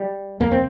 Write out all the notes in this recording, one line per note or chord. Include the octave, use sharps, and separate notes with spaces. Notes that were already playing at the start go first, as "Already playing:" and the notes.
Already playing: G3
F1 D#2 A#3
C4